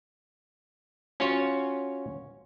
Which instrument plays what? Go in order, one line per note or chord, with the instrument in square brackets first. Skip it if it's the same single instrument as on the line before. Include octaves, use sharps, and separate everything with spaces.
[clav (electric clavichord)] C#4 F4 F#4 C#5